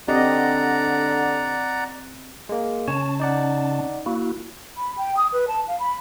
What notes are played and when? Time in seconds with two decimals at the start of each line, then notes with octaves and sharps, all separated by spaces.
0.08 D3 C4 G4 D5 D#5 F#5 A#5
2.49 G#3 A#3
2.88 C#3 C#4 C#5 A5
3.20 D#4 D5 F#5
4.06 A#3 E4 F#4
4.77 B5
4.97 G5
5.17 D#6
5.32 B4
5.48 A5
5.68 F5
5.79 B5